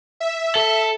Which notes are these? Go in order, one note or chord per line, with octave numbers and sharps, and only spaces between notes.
E5
A4